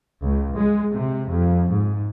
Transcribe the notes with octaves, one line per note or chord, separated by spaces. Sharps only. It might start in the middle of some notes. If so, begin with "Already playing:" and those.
C#2
G#3
C3
F2
G#2